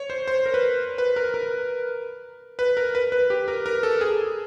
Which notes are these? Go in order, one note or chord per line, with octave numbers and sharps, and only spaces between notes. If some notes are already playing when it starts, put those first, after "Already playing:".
Already playing: C#5
C5
C5
A#4
B4
B4
A#4
A#4
B4
A#4
B4
B4
G4
A#4
A#4
A4
G#4